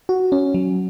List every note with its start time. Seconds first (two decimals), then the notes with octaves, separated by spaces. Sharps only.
0.09 F#4
0.32 C#4
0.54 F#3